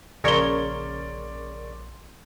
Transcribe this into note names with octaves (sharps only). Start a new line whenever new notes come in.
A#1 C#3 A#4 C#5 D5 C6 G7